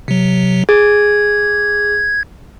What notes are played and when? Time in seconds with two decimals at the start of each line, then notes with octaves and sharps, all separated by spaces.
0.08 C3 F#3
0.69 G#4 G#6